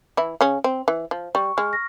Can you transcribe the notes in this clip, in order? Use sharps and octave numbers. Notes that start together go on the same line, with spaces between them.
E3 E4
C#3 C#4
C4
E3
F3
G3 C#6
G#3 F6
A#6